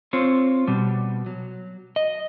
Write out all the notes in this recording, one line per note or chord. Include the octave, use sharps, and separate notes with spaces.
C4 F4 C5 C#5
B2 G3
F#3
D#5